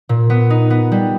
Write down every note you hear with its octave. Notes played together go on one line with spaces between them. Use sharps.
A#2
B3
D#4
B3
G3